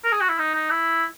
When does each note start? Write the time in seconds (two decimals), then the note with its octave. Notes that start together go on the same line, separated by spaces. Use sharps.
0.04 A#4
0.12 G#4
0.21 F#4
0.29 E4
0.39 D#4
0.55 D#4
0.70 E4